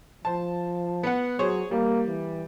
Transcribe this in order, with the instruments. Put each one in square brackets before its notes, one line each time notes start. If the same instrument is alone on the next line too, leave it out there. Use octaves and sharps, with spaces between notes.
[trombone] F3 [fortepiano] C5 A5
[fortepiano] B3 F#5
[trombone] F#3 [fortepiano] G#4 C5 C#5
[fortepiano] G3 [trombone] A#3
[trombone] E3